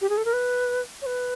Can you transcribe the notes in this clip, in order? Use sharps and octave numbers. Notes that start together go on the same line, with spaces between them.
G4
G#4
A4
A#4
B4
C#5
B4